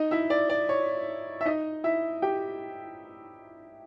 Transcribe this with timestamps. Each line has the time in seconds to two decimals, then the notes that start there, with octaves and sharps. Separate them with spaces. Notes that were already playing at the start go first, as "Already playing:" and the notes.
Already playing: D#4 D#5
0.11 E4 E5
0.30 D5
0.50 D5
0.69 C#5
1.41 E5
1.45 D#4 D#5
1.84 E4 E5
2.22 G4 G5